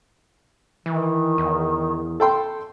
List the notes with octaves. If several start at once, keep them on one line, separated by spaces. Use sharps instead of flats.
D#3 E3
E2
A4 G5 C6